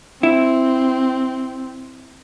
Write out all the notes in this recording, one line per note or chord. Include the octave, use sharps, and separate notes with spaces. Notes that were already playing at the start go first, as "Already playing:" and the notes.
C4 E4